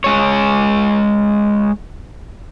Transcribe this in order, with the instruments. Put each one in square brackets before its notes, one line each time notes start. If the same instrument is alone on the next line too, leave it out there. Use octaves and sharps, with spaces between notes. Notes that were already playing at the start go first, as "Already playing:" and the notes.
[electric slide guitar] G#3 C#5